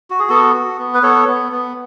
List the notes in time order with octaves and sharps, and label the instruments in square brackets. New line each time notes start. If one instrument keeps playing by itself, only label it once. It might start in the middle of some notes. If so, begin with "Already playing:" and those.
[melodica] F#4
G#4
B3 F#4 A4
F#4
B3
B4
B3 A4 C#5
B3
B3